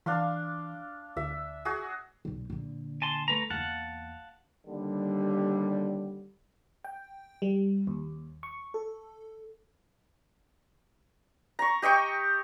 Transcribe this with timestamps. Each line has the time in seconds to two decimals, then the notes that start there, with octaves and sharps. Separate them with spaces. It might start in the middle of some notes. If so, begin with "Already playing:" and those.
0.06 E3 D4 F5 C6
1.17 D2 E5
1.65 F#4 G#4
2.25 B1 A#2
2.50 A#2 D3
3.02 G#5 A5 C6
3.28 A3 B4 A#5
3.50 E2 A#3 F5 F#5 A5
4.67 D#2 D3 G3
6.84 G5
7.42 G3
7.87 D#2
8.43 C#6
8.74 A4
11.59 A#5 C#6
11.82 G4 D#5 G5 C#6